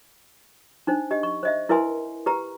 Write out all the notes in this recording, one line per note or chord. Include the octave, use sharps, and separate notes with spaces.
D4 D#4 C5
G4 D#5
C#6
C5 D#5 E5
E4 A#4 B4 E5 G#5 C6
G4 B4 A#5